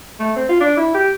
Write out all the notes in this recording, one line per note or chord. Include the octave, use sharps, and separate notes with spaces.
A3
C4
F4
D4
E4
G4